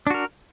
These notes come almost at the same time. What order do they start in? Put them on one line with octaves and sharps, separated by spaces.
D4 F#4 A#4